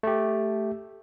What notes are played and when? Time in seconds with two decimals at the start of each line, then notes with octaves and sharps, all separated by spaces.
0.03 A3 G4